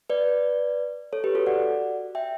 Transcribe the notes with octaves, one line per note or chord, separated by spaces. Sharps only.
B4 D5
A4 C#5
G4 B4
F#4 A4
D5 F#5
E5 G5